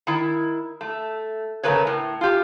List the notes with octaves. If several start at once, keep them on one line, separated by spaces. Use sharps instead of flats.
D#3 E4
A3
C#3 A3 C4 A#4 B4 C#5
A2
F4 G4